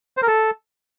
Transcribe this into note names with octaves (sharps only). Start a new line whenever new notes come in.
C5
A#4
A4